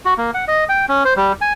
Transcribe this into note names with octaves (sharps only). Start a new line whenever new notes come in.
F#4
A#3
F#5
D#5
G5
C#4
C5
G3
G#5